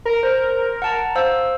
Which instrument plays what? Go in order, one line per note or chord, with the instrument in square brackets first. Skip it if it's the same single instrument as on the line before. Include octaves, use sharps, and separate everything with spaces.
[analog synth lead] A#4
[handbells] C5
F#5 A5 A#5
C5 F5 E6